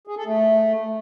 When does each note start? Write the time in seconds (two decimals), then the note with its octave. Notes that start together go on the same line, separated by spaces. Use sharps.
0.07 G#4
0.17 A4
0.26 A3